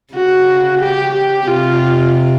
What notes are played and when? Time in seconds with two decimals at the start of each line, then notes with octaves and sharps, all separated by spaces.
0.14 C#3 F#4
0.81 G4
1.14 G4
1.47 C3 F4